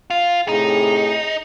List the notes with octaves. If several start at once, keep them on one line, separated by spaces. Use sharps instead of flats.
F4
A2 C3 D#4 G#4